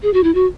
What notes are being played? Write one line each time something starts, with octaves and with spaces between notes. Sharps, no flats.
G#4
F#4
E4
F#4